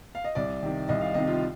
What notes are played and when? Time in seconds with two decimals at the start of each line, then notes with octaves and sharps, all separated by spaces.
0.15 F5
0.24 D#5
0.35 C2 D5
0.63 C3 D#3
0.88 C2 D#5
1.01 F5
1.14 C3 D#3 D#5
1.27 F4